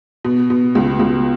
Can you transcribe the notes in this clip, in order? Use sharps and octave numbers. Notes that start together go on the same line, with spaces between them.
B2
B2
C#2
C#2